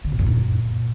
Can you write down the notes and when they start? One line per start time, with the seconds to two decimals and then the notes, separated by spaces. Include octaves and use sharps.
0.04 D3
0.12 G#2
0.19 F#2
0.26 A#2